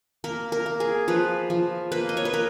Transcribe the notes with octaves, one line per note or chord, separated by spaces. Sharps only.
A#3 A#4
A#4
A#3
G#4
F3 B4
F3
A#3 B4
D#5
C#5
B4
A#3 A#4